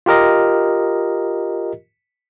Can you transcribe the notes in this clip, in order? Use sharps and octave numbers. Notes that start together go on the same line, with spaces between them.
F4 G4 A#4 D#5